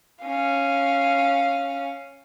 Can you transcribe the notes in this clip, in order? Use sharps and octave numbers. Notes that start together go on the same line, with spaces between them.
C#4 F5